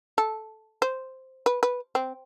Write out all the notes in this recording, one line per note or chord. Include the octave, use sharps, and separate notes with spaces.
A4
C5
B4
B4
C4